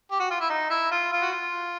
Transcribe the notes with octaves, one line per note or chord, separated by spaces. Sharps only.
G4
F#4
F4
E4
D#4
E4
F4
F4
F#4
F4